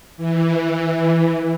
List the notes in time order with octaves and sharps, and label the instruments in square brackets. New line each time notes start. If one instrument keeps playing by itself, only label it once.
[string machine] E3